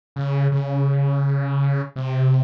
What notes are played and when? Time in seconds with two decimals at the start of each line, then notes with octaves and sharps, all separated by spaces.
0.16 C#3
0.52 C#3
1.96 C3